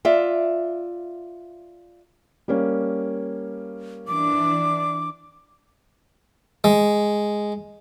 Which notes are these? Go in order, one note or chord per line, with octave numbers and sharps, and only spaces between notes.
F4 D5 E5
G3 A#3 C#4
E3 D4 D6
G#3